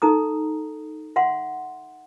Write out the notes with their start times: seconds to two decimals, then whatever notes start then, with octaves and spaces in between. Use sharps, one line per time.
0.02 D#4 A4 A#5 D#6
1.16 E5 F#5 C6